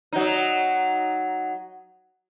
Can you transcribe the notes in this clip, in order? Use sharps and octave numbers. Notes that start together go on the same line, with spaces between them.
F#3 D#4